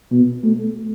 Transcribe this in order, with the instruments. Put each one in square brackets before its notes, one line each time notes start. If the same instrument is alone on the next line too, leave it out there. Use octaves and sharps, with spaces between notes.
[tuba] B2
A3